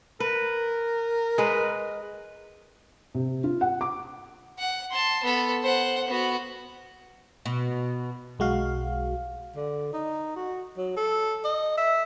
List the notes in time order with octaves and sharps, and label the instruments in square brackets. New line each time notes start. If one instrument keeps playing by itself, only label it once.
[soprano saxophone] A#4 [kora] B4
[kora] G#3 B4
[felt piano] C3
F4
F#5
D6
[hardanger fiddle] F#5
A5 C6
B3 A4
C5 F#5
B3 F#4
[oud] B2
[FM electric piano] B1 G#3 F#4 F5
[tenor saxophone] D3
D#4
F#4
F#3
A4
D#5
E5